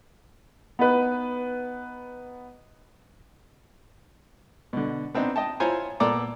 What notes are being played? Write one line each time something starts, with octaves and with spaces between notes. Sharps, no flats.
B3 D#4 B4
B2 D3
B3 C4 D4 D#4
D#5 G5 A5
E4 F4 C5 C#5 G#5 A#5
A#2 B3 A4 D5 A#5 D6